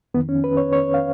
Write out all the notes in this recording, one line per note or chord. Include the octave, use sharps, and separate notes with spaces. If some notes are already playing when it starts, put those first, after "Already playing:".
F2 D#3 B3
C#4
B4
C#5
C#5
F5